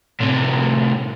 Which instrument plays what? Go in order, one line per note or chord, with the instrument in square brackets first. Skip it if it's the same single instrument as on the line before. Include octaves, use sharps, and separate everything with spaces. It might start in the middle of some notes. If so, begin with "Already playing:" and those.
[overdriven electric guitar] A2 C3